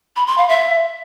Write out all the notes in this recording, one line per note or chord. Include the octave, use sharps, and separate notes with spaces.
B5
C6
F5
E5